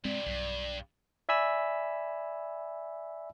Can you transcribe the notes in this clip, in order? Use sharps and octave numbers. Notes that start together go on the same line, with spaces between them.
G2 C3 G#3 C4 D5
B1 G2
D5 E5 G#5 B5 E6